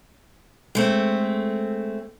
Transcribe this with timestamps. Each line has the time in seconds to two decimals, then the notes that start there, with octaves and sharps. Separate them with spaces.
0.75 G#3 A3 C4